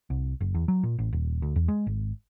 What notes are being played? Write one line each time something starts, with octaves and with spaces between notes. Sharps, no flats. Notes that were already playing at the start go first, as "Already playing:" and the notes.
C2
F#1
E2
F#3
A#2
A1
D#1
D2
E2
G#3
G#1